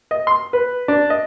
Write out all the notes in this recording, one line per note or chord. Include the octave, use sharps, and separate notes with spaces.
D#5
C6
B4
D4
D#5